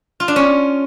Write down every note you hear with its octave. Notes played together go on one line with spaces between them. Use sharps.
F4
D4
C#4